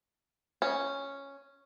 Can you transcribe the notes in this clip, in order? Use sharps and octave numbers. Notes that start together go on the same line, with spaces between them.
C#4